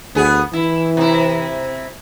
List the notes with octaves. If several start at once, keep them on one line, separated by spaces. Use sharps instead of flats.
D2 B3 G#4
E3 E4
C3 E4